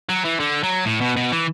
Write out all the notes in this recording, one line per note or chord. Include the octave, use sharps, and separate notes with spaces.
F#3
E3
D3
F#3
A2
B2
B2
E3